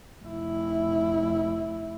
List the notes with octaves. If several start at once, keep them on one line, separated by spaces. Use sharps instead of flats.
F1 E4